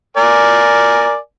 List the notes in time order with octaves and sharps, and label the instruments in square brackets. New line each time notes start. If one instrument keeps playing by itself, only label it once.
[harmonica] A#4 D5 G#5